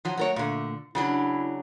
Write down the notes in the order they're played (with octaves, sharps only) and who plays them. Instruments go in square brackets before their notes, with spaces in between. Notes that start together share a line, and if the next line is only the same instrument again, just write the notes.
[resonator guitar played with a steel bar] F3 F#3
[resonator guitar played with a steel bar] F#3 A#4 C#5 [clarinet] A3
[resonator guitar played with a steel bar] A#2 D3
[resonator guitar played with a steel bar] C#3 F#3 D4 [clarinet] E4